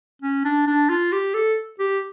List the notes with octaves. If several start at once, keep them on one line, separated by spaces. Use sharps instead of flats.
C#4
D4
D4
F4
G4
A4
G4